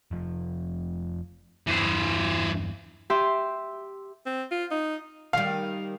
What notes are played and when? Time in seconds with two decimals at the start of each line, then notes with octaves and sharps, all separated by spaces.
0.11 F1 F3
1.67 E2 G2 E3 C5
3.10 G4 E5 C6
4.26 C4
4.51 F4
4.71 D#4
5.33 D#3 G3 F5